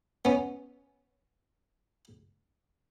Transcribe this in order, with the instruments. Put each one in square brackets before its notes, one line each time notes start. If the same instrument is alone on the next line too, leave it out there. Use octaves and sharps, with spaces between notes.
[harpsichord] B3 C#4